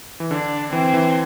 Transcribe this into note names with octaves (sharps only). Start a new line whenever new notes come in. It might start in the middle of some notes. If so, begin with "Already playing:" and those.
E3
D3 D4
E3 C4
E3